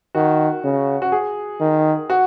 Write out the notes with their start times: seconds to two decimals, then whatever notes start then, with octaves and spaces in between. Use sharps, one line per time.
0.15 D#3 F#4
0.64 C#3
1.02 F#4
1.12 G#4
1.61 D#3
2.10 F#4